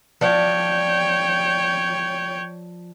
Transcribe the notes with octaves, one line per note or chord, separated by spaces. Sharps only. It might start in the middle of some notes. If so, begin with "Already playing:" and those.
F3 C#5 D5 G5